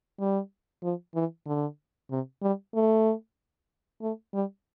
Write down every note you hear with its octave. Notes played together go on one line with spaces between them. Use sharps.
G3
F3
E3
D3
C3
G3
A3
A3
G3